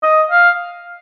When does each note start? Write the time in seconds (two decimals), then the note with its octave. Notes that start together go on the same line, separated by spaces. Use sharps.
0.03 D#5
0.31 F5